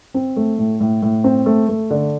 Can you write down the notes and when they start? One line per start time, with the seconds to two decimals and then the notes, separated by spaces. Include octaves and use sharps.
0.14 C4
0.36 A3
0.58 A2
0.80 A2
1.02 A2
1.24 C4
1.46 A3
1.69 A3
1.91 D3